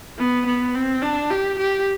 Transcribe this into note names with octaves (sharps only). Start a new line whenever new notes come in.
B3
B3
C4
D4
G4
G4